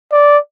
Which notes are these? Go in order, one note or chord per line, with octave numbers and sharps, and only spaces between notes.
D5